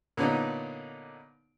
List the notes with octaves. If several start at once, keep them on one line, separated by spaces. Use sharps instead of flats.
A#2 D3 B3 C#4 D#4